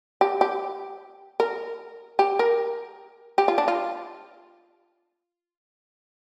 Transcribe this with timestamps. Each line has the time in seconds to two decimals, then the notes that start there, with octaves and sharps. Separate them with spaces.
0.21 G4
0.41 G4
1.40 A#4
2.19 G4
2.39 A#4
3.38 G4
3.48 F4
3.58 D4
3.68 F4